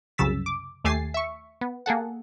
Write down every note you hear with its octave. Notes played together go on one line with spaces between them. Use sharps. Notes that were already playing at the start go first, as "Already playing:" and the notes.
C2 F#2 C#3 E6 A6 B6
D6
D#2 A3 G4 G#5 A6 C7
E5 C#6
B3
A#3 G#4 A4 F#5